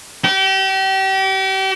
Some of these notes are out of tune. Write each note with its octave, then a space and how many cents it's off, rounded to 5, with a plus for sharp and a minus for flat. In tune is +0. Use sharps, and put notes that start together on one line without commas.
G4 -35